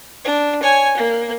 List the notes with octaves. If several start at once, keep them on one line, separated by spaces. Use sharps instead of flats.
D4
C#5 G#5
A#3